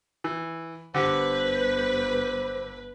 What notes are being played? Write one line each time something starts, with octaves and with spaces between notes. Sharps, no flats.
E3
G1 D3 G4 B4 C5